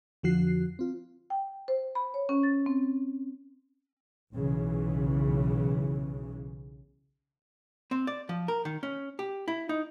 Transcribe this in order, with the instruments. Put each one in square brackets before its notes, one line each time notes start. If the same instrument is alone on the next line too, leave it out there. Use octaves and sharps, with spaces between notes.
[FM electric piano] F2 D3 F3 F#4 F#6 C7
C4 F4
[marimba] G5
C5
B5
C#5
C#4
A6
C4
[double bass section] B1 C#3 E3
[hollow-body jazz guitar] C4
D5
F3
A#4
D#3
C#4
G4
E4
D#4